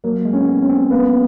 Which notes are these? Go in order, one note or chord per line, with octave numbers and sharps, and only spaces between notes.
F#3 A#3
G#3
C#4
B3
C#4
C4
A#3 B3